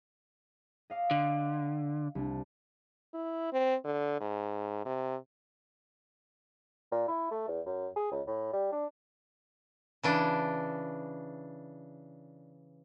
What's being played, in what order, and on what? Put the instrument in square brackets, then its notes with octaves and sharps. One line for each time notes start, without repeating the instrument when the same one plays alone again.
[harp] D#5 F5 D6
[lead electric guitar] D3 [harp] A6 C#7
[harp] C2 D4
[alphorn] E4
C4
D3
G#2
C3
[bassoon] A#2
E4
A3
E2
F#2
G#4
C#2
A2
G3
D4
[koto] C#3 E3 D4